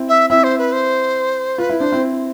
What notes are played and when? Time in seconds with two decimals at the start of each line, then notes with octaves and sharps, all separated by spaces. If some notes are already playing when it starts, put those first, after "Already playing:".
Already playing: C4 E4
0.09 E5
0.30 C4 E4 E5
0.44 C5
0.58 B4
0.73 C5
1.58 F4 B4
1.70 E4
1.80 D4 C5
1.92 C4 E4